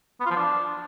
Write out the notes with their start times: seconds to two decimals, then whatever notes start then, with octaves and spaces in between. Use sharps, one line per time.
0.20 B3
0.26 F4
0.31 F3
0.36 D4